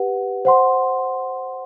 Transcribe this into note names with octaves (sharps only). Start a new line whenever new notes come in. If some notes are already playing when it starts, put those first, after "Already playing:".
Already playing: G4 B4 F#5
C5 F#5 C6